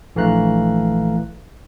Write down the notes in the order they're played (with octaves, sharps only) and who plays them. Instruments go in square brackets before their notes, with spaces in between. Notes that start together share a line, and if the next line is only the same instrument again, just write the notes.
[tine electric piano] A#1 E3 A3 F5 A#5 F#6